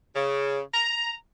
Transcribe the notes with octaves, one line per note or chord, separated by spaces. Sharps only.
C#3
A#5